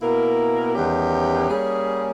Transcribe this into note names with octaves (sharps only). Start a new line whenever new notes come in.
B2 A#3 E4 A#4
E2 D#3 G3 C#4 G4
G3 A#3 C#4 G#4